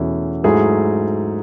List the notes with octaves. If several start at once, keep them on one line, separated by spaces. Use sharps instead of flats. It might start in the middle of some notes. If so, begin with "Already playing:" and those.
Already playing: E2 B2 A3 C#4 E4
G#2 F#3 A3 E4 G#4